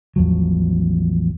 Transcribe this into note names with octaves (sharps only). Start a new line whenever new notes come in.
A1 E2 F3 F#3